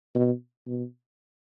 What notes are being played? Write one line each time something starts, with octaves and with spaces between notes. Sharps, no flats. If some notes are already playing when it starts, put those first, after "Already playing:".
B2
B2